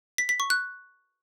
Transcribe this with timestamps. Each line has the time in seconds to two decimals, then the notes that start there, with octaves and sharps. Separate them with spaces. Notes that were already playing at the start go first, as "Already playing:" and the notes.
0.18 B6
0.29 B6
0.40 C#6
0.50 F#6